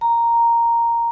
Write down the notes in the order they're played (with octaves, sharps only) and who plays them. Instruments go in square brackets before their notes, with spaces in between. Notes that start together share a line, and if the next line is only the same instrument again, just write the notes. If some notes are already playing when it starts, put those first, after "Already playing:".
[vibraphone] A#5